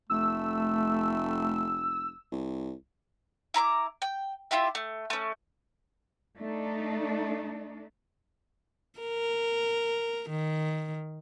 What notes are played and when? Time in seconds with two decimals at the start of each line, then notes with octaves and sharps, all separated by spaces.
0.10 F1 A3 E6
2.32 C2
3.54 E4 A#5 B5 D6
4.02 G5
4.51 E4 F4 G4 E5
4.75 A3
5.10 A3 C#4
6.38 A3 D4 D#4
9.00 A#4
10.30 D#3